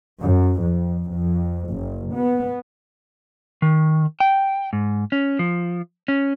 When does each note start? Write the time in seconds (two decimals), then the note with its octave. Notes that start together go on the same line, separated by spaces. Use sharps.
0.21 F#2
0.63 F2
1.13 F2
1.70 F#1
2.14 B3
3.62 D#3
4.20 G5
4.73 G#2
5.12 C#4
5.39 F3
6.08 C#4